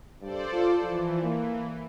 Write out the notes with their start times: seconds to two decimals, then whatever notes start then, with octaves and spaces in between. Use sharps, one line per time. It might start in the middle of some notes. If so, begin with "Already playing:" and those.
0.21 G2 A4 C5 D5
0.53 F4
0.83 E3 F3
1.23 A#3